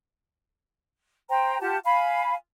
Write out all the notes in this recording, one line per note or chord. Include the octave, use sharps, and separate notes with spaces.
C5 G5 A#5
F4 G4 F#5 A5
F5 G#5 B5